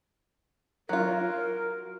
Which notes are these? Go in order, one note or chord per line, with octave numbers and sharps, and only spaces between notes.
F#3 F4 A#4